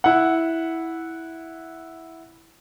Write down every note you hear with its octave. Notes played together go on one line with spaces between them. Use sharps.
E4 F#5